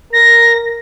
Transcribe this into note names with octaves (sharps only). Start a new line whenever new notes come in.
A#4 A#6